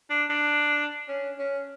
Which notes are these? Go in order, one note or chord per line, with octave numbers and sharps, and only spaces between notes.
D4
D4
C#4
C#4